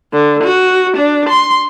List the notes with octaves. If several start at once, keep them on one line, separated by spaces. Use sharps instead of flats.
D3
F#4
D4
C6